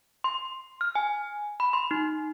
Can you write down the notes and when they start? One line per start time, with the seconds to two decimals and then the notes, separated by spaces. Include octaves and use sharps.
0.24 C6
0.81 F6
0.95 G#5
1.60 B5
1.73 C6
1.91 D#4